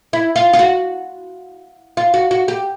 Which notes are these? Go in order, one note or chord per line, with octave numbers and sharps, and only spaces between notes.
E4
F4
F4
F#4
F4
F#4
F#4
G4